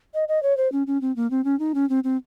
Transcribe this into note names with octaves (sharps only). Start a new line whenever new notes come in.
D#5
D#5
C#5
C5
C#4
C#4
C4
A#3
C4
C#4
D#4
C#4
C4
C4